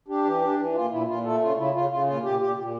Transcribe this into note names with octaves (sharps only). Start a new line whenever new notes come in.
D4 G4
E3
D4
E3
A#2 F4
A#2 E4
A#2 F4
A3 A4
C#3 F4
C#3 E4
C#3 F4
C#3 F4
A#2 F4
A#2 G4
A#2 G4
A#2